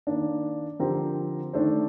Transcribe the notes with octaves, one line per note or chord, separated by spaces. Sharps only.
D#3 A#3 D4
D3 F3 C4 G4 A#4
D#3 A3 D4 A4 C5